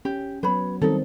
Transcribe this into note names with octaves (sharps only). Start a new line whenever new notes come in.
C#4 G4
F#3 B3 B4 C#5 B5
D#3 G3 C4 D#4 A4